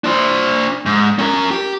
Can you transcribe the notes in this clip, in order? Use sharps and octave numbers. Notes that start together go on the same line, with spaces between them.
D4 C5
G#2
C#4 A#4
G4